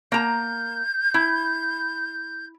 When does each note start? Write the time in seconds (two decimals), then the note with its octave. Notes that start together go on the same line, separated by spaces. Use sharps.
0.12 A#3 A#5 G6
1.14 E4